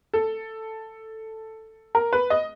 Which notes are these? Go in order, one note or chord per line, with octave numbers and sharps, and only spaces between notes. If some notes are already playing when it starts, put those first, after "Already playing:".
A4
A#4
B4
D#5